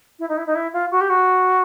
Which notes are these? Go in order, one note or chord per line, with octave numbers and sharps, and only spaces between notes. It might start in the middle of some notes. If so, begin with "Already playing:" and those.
E4
D#4
E4
D#4
E4
F4
F#4
G4
F#4